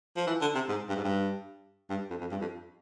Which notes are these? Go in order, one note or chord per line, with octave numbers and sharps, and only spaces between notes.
F3
E3
D3
C3
G#2
G2
G#2
G2
G2
F2
F2
G2
F2